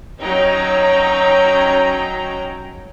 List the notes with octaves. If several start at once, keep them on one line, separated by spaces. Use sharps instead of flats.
F#3 C#4 D#4 G5 A#5